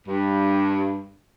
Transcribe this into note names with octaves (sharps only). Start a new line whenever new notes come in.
G2